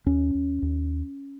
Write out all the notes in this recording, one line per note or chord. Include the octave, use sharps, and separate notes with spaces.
D#2 C#4
D#2
D#2